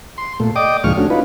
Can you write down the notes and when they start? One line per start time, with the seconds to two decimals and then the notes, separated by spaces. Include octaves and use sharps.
0.18 C6
0.40 A#2 A3
0.56 D5 D#5 G5 D6 D#6
0.84 D2 A#2 F3 G#3 C#6 F6
0.97 A3 C#4 D4 F#4
1.10 C#4 D#4 F4 B4